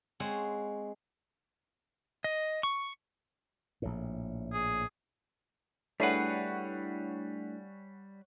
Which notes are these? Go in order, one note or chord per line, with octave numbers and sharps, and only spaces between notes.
G#3 C4 C5 C#5 D#5 F#5
D#5
C#6
A#1 A2
G#4
G3 A3 D4 E4 G#4 B4 C#5 F#5